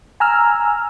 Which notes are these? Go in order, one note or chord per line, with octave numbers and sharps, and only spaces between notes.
G#5 A#5 E6 F6